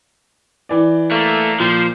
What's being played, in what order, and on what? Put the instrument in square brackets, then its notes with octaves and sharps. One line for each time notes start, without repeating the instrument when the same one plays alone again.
[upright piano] E3 D5
[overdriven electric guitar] A3 [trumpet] A#3
[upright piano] A#2 [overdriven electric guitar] F3 [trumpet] C5